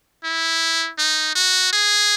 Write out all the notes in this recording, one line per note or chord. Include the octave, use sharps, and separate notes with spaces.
E4
D#4
F#4
G#4